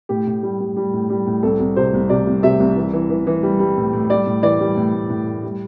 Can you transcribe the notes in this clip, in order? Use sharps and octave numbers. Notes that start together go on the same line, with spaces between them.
A2 G4
A2
G3
G3
G3
A2
G3
A2
C2 A4
C2
C3 C5
C2
C3 D5
C2
C3 E5
C2
E3
E3
E3
E3
G3
G3
A2
A2
G3 D5
A2
E3 D5
G3
A2
A2
A2
A2
G3